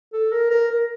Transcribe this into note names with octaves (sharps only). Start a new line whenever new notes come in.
A4
A#4
A#4
A#4